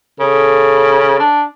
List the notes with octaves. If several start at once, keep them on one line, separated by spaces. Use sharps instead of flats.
C#3 A4
D4